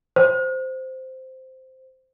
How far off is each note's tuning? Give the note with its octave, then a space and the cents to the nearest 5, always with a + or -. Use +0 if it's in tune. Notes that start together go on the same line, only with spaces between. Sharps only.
C5 -5